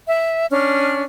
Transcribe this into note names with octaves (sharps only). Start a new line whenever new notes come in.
E5
C#4 D4 F6